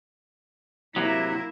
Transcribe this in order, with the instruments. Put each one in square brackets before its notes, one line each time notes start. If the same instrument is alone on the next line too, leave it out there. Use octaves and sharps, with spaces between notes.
[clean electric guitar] C3 F#3 [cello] A#3 E4